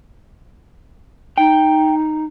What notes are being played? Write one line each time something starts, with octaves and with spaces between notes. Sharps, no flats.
D#4 G5